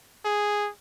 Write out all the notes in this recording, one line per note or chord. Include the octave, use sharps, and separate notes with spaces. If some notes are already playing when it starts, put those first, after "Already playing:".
G#4